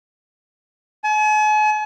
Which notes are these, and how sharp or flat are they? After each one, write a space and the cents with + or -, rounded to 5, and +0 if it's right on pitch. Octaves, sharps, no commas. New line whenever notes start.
G#5 +45